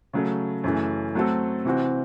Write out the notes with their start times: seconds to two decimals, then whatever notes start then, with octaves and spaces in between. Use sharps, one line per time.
0.13 C#3 F#3 A3
0.64 F#2 C#3 E3 A3
1.15 F#3 A3 C4 F#4 A4
1.65 C3 E3 C4 F#4